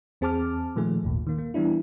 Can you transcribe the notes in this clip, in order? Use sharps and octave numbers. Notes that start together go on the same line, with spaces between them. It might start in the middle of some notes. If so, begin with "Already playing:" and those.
E2 C4 G#4 A5 D6 F6
A#2 D#3 F3 A3 G#4
G#1 D#2 A#2
D#3 A#3
A#3
E3 G3 B3 D4 E4